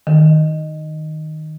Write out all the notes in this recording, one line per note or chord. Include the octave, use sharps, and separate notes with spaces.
D#3